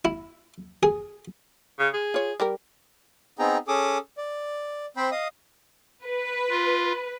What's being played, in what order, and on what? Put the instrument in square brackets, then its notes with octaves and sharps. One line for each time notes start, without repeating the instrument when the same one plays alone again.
[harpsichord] E4
G#4
[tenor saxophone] C#3
G#4
[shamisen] F4 C#5
G3 G4 A#4
[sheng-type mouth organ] B3 C4 D#4 G#4 G5 A#5
C#4 G#4 A4 D6 D#6
D5
C4 C5 G5 B5
D#5 F5 D#6
[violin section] B4
[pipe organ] F4